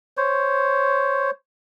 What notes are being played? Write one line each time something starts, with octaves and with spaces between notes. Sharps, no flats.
C5 C#5